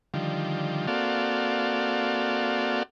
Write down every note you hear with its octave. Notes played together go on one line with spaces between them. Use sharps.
D3 D#3 F3 G3
A#3 C4 F#4 A4 D5 F5